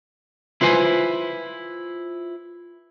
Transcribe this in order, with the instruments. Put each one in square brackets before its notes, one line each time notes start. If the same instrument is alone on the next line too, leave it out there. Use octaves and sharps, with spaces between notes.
[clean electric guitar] E4 F4 B4 C5 G#5